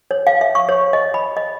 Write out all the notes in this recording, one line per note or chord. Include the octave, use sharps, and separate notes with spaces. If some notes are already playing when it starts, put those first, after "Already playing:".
C#5
F5
E5
C#6
C#5
D#5
B5
D#5